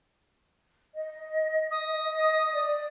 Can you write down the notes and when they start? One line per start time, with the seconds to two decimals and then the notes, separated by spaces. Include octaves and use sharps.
0.95 D#5
1.70 D#6
2.09 D#5
2.52 D5